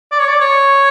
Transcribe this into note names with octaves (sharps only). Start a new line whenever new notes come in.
D5
C#5
D5
C#5